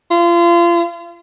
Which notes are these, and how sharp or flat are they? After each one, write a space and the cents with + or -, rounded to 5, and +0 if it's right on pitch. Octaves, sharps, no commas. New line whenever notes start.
F4 -30